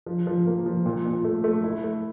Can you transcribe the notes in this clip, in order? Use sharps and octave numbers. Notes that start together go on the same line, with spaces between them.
F3
F3
A#3
F3
A#2
A#2
A3
A3
E4
A3